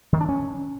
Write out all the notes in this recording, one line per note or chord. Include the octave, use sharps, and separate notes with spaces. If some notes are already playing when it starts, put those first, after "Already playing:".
D#3
D4
C#4